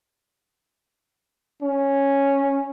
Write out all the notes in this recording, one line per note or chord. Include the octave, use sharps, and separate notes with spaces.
C#4